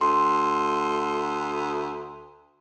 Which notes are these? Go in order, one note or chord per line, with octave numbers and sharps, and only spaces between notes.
D2 C6